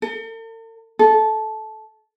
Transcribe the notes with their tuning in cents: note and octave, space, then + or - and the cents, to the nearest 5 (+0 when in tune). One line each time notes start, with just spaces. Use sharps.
A4 +45
A4 -15